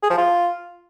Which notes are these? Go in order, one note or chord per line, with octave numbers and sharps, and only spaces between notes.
G#4
F3
F4